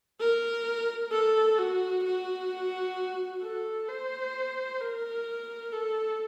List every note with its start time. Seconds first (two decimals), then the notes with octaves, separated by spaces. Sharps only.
0.20 A#4
1.12 A4
1.58 F#4
2.04 F#4
3.43 A4
3.88 C5
4.81 A#4
5.73 A4